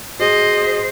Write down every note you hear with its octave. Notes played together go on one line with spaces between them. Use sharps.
F#4 G#4 C5 D#5